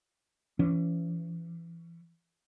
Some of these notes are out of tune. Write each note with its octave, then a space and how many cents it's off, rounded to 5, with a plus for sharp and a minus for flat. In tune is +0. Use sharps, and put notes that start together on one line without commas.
E3 +30 C#4 +25